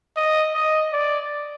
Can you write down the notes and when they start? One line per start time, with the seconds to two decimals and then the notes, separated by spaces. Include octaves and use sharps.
0.17 D#5
0.54 D#5
0.93 D5